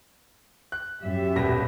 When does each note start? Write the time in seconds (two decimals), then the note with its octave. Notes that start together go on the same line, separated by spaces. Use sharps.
0.72 F#6
1.02 F#2 G4 E5
1.36 D#1 B2 A#6